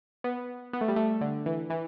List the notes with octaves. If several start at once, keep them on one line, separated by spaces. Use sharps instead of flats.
B3
B3
A3
G3
A3
D3
E3
E3